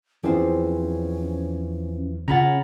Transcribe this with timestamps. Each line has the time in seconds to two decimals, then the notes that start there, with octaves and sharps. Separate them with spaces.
0.24 E2 E3 F3 C4 C#4 C5
2.28 C#3 C#4 F4 F#5 A#5 B5 A6